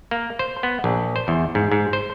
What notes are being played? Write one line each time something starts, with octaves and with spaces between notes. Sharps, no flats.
A#3
C5
B3
A#1
C5
E2
G#2
G#2
C5